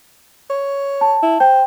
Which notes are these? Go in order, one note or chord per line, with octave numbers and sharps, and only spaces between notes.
C#5
A5
E4
C5 G5 G6